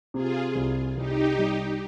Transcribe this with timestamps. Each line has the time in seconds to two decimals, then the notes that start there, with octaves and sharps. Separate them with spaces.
0.14 C3 F4 G#4
0.55 C2
0.96 C2 D#4 G4
1.38 G3